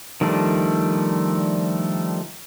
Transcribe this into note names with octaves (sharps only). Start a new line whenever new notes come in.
D#3 F3 G3 A3 D4